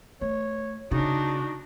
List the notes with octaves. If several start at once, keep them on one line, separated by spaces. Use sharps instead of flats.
A3 C#5
C#3 D4 D#4 F#4